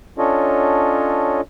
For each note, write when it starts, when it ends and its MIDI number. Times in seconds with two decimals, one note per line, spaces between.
0.18 1.41 61
0.18 1.41 62
0.18 1.41 65
0.18 1.41 69
0.18 1.41 73
0.18 1.41 75